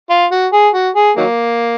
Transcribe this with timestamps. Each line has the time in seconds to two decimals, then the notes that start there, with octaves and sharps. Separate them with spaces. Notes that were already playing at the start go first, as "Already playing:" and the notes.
0.10 F4
0.32 F#4
0.53 G#4
0.74 F#4
0.96 G#4
1.17 D#3 F#3 A#3